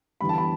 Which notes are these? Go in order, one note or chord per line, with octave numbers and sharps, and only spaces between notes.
E2 D3 G3 B5
A5
B5